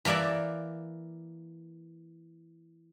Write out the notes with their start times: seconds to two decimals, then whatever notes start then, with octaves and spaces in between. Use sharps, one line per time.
0.05 E3 A#3 A#4 D5 E5